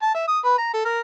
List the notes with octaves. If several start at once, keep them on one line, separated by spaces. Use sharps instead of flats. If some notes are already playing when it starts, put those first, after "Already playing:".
A5
E5
D#6
B4
A#5
A4
A#4